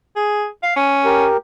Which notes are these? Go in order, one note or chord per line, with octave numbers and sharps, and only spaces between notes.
G#4
F5
C#4
G4 A#4